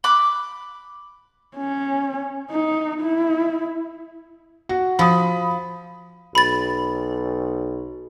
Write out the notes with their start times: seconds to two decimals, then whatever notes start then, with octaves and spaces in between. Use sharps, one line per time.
0.04 B5 D6 F#6
1.57 C#4
2.51 D#4
3.01 E4
4.69 F#4
4.99 F3 B5 D#6
6.35 B1 B5 A6